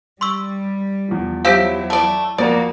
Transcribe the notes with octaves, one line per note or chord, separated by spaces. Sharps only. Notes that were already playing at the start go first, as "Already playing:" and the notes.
G3 C6 C#6 E6
E2 F3
F#3 C4 E4 G4 F5 E6 G6
A3 D5
F2 A#3 F#4 D5 A#5 F7